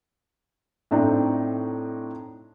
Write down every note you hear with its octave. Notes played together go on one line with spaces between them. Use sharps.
A2 C4 D4 D#4